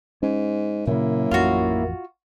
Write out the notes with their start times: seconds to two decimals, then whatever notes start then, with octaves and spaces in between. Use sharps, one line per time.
0.23 G#2 C#4
0.87 F#2 A#2 C#3 A#3 E4
1.31 A1 F2 F4 F#4